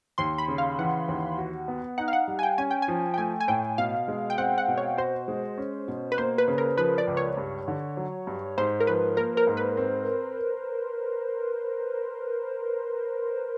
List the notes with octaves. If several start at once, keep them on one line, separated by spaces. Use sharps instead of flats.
D#2 C6
B5
C#3
F5
E3 F#5
D#2
F#4
B3
D#4 F#5
F5
F#5
G3
G#5
G5
C#4 G#5
G5
G#5
F3
G5
A3 G#5
G#5
A2 G5
B2 F5
G#3
G5
C4 F#5
F#5
B2
C#5
F#4 C5
G#3
C#4
B2
B4
A#3 C5
B4
C#3
A#4
F3 B4
D5
C#2
C#5
G2
D3
F#3
G2
G#2 C5
A#4
F3 B4
A#3 A#4
A#4
G#2
B4
C4